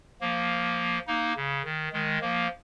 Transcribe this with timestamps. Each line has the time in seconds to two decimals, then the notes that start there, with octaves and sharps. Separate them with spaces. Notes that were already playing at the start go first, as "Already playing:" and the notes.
0.21 F3 A#3
1.07 A#3 D#4
1.37 C#3
1.64 D#3
1.93 D#3 G#3
2.21 F3 A#3